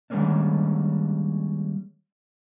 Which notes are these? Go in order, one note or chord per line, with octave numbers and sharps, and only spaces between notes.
D#3 G3 G#3 A#3 C#4 D4